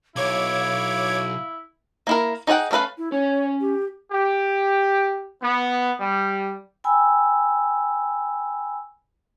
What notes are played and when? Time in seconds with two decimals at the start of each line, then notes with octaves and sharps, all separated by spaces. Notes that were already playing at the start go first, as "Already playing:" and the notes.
0.16 B1 E4 C#5 F5 D6 G#6
2.07 A#3 E4 A#4
2.47 D#4 G#4 C#5 F#5 G5
2.71 A3 C#4 A#4 B4 F5
2.98 E4
3.12 C#4 C#5 G#5
3.61 G4
4.11 G4
5.41 B3
6.00 G3
6.84 G5 G#5 B5 E6